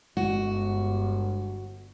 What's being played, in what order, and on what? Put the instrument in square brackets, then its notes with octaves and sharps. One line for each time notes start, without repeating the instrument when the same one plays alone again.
[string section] G1 [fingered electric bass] G#3 [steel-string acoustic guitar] F#4